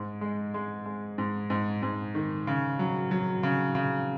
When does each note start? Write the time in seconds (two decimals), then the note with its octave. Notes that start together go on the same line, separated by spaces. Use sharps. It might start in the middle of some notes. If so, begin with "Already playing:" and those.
Already playing: G#2
0.21 G#3
0.54 G#3
0.86 G#3
1.18 G#2
1.50 G#2
1.83 G#2
2.15 D#3
2.47 C#3
2.79 F#3
3.11 F#3
3.43 C#3
3.75 C#3